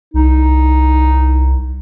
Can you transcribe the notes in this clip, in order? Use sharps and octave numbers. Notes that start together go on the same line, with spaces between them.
C2 D#4